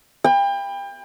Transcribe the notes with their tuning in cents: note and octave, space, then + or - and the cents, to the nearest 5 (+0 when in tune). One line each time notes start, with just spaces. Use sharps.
G5 +30 B5 +0